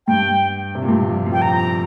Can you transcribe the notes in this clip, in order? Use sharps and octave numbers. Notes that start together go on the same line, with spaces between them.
G2 G5
C3
A#2
G2
A#2
F2
F2
G5
A#5